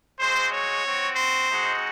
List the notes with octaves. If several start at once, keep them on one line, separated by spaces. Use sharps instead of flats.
G#3 C4 F#4 C5
C#5
C4 F#4
C5
G#3 C4 D#4 F#4